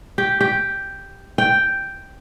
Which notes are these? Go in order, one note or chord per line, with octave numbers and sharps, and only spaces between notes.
G4
G4
G5